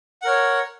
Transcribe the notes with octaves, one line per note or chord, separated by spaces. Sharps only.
A#4 C#5 F#5